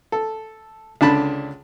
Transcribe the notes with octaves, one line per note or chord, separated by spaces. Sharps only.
A4
C#2 D3 D4 A5 B5